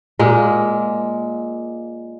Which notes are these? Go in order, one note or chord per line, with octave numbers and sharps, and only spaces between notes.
A#2 G#3 A#3